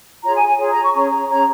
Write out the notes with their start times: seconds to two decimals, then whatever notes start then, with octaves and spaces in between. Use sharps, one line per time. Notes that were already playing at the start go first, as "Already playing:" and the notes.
0.22 F4 G#4 C#5 A#5
0.35 G#5
0.45 G#5
0.58 F4 G#4 C#5
0.70 A#5
0.82 C#6
0.93 C#4 G#4 C#5 A#5
1.11 A#5
1.29 C#4 G#4 C#5 A#5